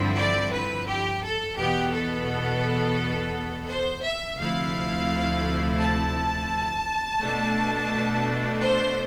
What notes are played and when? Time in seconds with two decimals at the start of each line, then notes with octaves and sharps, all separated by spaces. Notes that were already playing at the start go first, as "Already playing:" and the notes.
Already playing: G2 D3 F3 C4 E4
0.16 D5
0.50 B4
0.87 G4
1.22 A4
1.56 E2 B2 B3 G4
1.92 A4
3.69 C5
4.04 E5
4.38 D2 C3 F3 A3 E4 F5
5.81 A5
7.21 B2 A3 D4
8.63 C5